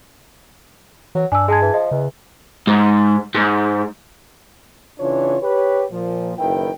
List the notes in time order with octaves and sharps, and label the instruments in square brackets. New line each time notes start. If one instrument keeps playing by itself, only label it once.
[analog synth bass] E3 [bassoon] F#3
[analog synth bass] G2 [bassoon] D4 [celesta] G#5 E6
[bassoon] G#3 [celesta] G#4 A5 G#6
[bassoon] E3
[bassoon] F3 [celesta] D#5
[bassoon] E2 [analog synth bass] C#3
[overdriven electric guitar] G#2
G#2
[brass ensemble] C#3 E3 D4 F4 C#5
G4 B4 C#5
A#2 F3
F#1 D#3 E4 B4 G5